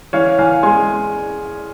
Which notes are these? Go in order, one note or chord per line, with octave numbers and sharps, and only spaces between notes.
E3 C#5 F5
E3 F5 G#5
G#3 G#5 C6